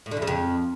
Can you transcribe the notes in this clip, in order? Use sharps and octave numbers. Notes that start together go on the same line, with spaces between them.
A2
D3
E2
C#3
F2